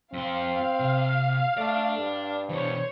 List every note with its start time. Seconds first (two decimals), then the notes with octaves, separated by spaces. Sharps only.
0.13 F2 C4 F5 C6
0.80 C3
1.58 A3 D5 A5
1.98 G2
2.49 B2 E3 C5 C#5